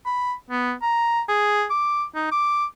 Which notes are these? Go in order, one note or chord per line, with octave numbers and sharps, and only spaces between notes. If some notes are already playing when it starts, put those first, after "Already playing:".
B5
B3
A#5
G#4
D6
D#4
D6